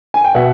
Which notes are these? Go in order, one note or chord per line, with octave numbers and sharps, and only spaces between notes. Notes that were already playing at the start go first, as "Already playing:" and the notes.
G#5
G5
B2 E5 F#5